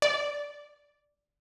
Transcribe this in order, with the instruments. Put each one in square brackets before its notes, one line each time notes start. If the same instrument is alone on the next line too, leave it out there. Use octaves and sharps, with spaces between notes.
[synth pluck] D5